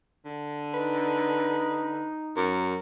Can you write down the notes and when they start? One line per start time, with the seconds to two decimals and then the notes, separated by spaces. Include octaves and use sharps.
0.25 D3
0.74 D#4 B4
2.36 F#2 A#4